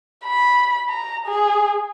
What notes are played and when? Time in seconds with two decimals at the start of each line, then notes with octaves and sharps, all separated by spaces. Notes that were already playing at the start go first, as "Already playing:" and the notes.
0.25 B5
0.89 A#5
1.26 G#4